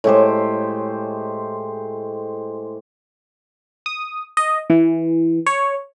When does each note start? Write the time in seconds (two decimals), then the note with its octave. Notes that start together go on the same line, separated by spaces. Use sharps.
0.04 A2 G#3 G4 C5
3.86 D#6
4.37 D#5
4.70 E3
5.46 C#5